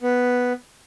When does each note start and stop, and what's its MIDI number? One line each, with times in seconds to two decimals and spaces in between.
0.01 0.53 59